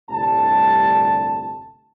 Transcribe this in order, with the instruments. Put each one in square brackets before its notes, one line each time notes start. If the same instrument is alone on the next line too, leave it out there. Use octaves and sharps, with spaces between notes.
[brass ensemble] G1 C2 A2 D3 A3 A5